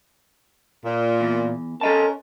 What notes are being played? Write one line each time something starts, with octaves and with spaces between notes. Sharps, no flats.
A#2
E2
C#4 A4 A#4 D#5 A5